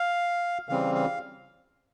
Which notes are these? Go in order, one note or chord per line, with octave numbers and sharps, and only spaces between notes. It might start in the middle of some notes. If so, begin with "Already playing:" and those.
Already playing: F5
C#3 E3 G3 C4 F5
F5